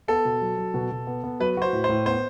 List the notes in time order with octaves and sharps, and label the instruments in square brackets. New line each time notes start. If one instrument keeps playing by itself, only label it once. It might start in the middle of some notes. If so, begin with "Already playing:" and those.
[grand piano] B3 [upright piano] A4
[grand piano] B2
F#3
F#3
B2
B2
B3
B3
[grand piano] F#3 [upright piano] B4
[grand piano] F#4 [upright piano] C5
[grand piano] A2
[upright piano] C5
[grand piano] A2
[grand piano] B3 [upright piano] C5